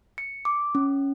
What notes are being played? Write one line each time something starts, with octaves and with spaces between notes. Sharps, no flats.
C#7
D6
C#4